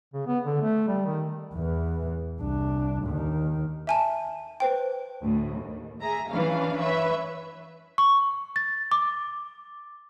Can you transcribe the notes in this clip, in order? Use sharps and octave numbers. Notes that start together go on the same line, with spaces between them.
C#3
B3
D3
A3
G3
D#3
E2 E3
C2 D4
D#2 D#3
E5 G#5 A5
B4 C5 G5
D2 A2
D#2
G#4 E5 A#5
E3 C#4 D4 F5
B4 C#5 E5
C#6
A6
D6